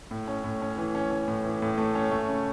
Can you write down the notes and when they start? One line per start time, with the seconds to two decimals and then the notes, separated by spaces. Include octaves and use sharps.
0.11 A2
0.28 C#4
0.44 A2
0.62 C#4
0.78 E3
0.95 C#4
1.11 C#4
1.28 A2
1.45 E3
1.62 A2
1.78 A3
1.95 C#4
2.11 A3
2.29 C#3